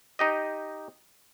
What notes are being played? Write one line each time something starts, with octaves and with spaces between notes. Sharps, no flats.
D#4 G4 D#5